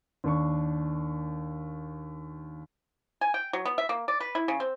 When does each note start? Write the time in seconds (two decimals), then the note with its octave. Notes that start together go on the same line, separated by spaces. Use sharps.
0.24 D#2 D4 C#6
3.21 G#5
3.34 G5
3.53 F#3
3.65 B3
3.78 E5
3.89 A#3
4.08 D5
4.20 B4
4.35 E4
4.48 C#3
4.60 C4